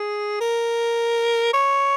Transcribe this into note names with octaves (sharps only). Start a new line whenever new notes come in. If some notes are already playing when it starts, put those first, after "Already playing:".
Already playing: G#4
A#4
C#5